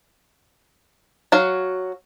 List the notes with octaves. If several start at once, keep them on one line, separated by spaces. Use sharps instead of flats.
F#3 F#4 F5